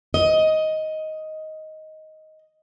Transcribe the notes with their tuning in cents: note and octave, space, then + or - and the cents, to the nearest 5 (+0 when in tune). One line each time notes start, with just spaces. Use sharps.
D#5 +10